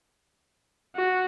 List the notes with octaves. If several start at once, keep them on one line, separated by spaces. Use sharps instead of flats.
F#4